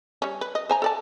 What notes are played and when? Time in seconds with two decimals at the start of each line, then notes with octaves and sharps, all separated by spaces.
0.22 G3 C#4
0.41 B4
0.55 D#5
0.69 C5 G#5 A#5
0.82 A4 D5 A5